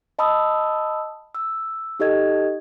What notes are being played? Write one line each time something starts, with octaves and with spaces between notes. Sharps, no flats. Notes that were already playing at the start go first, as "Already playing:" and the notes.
D#5 A5 B5 D#6 E6
E6
D#4 G4 A4 D#5 G#6